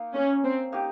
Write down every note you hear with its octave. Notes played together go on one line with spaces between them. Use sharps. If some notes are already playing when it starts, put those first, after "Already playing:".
Already playing: A#3 D#4 A#4 F5
C#4
C4
A#3 D#4 G4